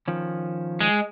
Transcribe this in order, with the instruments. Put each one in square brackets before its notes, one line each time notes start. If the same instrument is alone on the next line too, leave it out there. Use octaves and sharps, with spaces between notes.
[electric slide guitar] D#3 F3 C#4
[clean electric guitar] G#3